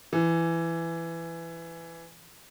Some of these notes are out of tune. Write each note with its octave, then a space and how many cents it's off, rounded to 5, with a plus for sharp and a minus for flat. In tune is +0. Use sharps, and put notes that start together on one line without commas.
E3 +15